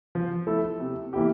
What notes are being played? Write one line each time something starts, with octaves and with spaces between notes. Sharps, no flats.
F3
A3 E4 A4
C3
E3 A#3 E4 G4